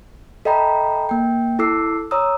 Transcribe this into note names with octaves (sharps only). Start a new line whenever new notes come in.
A4 D#5 E5 G5 A#5 B5
A#3 G5
E4 A4 D6 E6 C7
C#5 A#5 D#6 E6